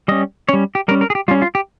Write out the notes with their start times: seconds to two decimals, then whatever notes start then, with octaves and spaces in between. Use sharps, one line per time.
0.08 G3 C#4 D#5
0.49 G3 C#4 C#5
0.75 G4
0.88 G3 C#4 A#4
1.01 A#4
1.10 G#4
1.15 G4
1.28 G3 F4
1.31 C#4
1.42 F4
1.55 G4